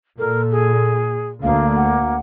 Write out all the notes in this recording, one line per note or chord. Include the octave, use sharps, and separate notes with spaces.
A#2 A4 A#4
G#4
D2 A#3 F5
F#5